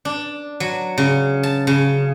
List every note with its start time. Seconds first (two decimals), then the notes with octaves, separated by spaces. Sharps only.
0.05 D4
0.60 F#3
0.98 C#3
1.43 A5
1.67 C#3